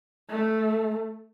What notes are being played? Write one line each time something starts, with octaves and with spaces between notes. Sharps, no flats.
A3